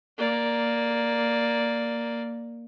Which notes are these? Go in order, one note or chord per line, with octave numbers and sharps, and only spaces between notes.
A#3 D5